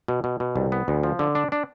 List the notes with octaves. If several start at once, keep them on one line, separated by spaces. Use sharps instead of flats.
B2
B2
B2
C2
B3
D2
F3
D3
D4
D4